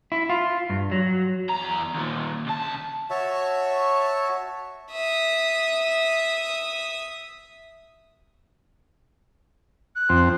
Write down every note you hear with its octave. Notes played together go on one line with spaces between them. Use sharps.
E4
F4
G2
F#3
E2 A#5
D#2 A#2
C#2 A5
F#4 C#5 E5 A5
E5 D#6
F#6
F2 C4